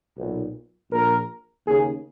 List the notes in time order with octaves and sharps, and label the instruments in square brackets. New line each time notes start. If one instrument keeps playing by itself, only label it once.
[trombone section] B1 A#2
A#1 A#2 A#4
D#2 C#3 G#4